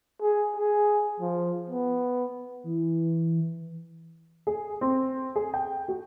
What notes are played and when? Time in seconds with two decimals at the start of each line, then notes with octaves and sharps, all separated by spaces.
0.21 G#4
0.56 G#4
1.20 F3
1.70 B3
2.64 E3
4.47 G#4
4.81 C4
5.36 G#4
5.54 G5
5.88 F#4